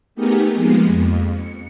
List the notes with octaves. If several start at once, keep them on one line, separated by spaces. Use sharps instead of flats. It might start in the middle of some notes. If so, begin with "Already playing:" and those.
A3 B3 D#4 G4 G#4 A#4
F3 G#3 A#3 B3
F2
C#7